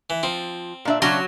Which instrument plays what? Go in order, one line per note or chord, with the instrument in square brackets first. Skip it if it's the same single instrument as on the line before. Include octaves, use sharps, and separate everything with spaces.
[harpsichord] E3
[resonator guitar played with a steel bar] F3 [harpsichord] C4
[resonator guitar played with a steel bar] A#2 D4 E5
[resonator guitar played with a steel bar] C#3 C#4 D4 [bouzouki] F#3 [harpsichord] C6